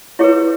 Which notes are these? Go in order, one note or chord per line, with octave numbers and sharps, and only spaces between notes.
E4 G#4 B4 C#5